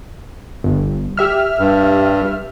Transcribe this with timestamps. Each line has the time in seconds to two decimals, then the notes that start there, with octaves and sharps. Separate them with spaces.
0.64 G1
1.17 G4 E5 F6
1.58 G2